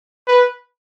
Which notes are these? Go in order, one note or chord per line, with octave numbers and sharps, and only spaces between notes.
B4